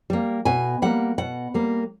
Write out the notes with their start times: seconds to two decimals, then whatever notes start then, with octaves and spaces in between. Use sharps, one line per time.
0.10 G3 A#3
0.45 B2 G#5
0.82 G3 A#3 F#5
1.18 B2 F#5
1.54 G3 A#3